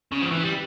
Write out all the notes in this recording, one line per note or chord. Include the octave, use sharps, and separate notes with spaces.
C#3
F3
E3
G3